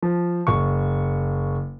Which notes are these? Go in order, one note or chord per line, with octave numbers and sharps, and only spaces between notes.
F3
F#1 C#6